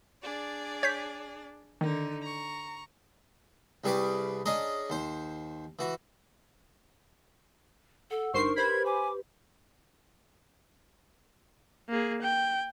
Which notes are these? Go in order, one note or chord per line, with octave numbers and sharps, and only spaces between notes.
D4 G#4 D5
C#5 G6 B6
D3 D#3 D#4
A#5 C#6
C2 G3 G#4 B4 C#6 D6
C#4 D4 G#4 D#5 A#5
D#2 C5
E3 F#4
A4 F#5 E6
G1 D4 D#4 A#4 C5 C#6 C7
G4 B4 C5 B5 G#6
G#5 D6
A#3 G#4
G5